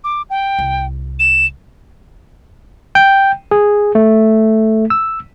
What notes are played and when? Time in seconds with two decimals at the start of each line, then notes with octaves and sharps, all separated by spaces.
0.04 D6
0.30 G5
0.59 C2
1.19 E7
2.95 G5
3.51 G#4
3.95 A3
4.90 E6